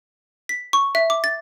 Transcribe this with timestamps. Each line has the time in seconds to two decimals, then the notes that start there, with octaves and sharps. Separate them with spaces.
0.49 B6
0.73 C#6
0.95 E5
1.10 D6
1.24 A6